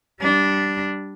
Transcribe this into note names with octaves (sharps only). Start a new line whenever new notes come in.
G3 D4